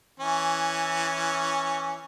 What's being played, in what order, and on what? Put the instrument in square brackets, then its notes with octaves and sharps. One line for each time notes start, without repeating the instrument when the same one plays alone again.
[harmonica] E3 C#4 G#5